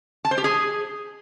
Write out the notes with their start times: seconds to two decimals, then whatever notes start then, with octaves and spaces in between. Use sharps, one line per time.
0.25 A5
0.31 C5
0.38 G4
0.44 G#4